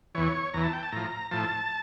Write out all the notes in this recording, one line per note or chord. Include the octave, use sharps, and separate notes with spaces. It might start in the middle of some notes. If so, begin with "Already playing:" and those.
E2 E3 C#5
E2 E3 A#5
A5
G5
A5
A2 F3 A#5
A2 F3 A5